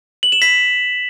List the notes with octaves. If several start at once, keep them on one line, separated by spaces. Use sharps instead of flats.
F#7
E7
B6